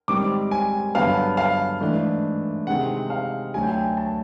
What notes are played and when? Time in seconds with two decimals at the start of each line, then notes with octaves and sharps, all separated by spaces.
0.08 G#2 D#3 G3 C4 D6
0.51 G#5
0.94 G2 D3 F#3 B3 F5
1.37 F5
1.81 G#2 E3 A3 D4
2.67 C3 D#3 G#3 C4 D#4 F#5
3.10 F5
3.54 D2 D3 F#3 G#5
3.63 G5
3.71 G#5
3.97 A5